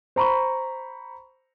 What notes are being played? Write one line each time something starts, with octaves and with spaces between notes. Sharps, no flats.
C5 A#5 B5 C#6